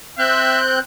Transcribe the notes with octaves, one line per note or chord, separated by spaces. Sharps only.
C4 E5 F#6 G6